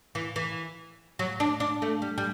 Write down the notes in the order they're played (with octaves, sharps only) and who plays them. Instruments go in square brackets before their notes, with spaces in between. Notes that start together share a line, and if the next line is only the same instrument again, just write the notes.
[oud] E3
E3
F#3
D4
D4
A3
G3
G3